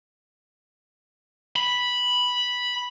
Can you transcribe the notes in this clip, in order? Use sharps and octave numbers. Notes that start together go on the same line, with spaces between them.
B5